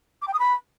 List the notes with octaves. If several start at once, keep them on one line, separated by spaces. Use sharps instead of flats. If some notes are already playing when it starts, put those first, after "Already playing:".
D6
G5
D#6
B5